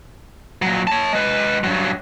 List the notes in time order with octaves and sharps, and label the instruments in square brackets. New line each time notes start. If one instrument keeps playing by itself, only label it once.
[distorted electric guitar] A#2 F#3
C#5 A5
G#3 B4
G2 F#3